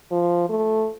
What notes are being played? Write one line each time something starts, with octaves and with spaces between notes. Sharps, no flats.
F3
A3